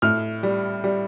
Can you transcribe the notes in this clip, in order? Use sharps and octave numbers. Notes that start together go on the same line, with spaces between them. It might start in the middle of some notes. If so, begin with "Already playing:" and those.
A2 F6
G3
G3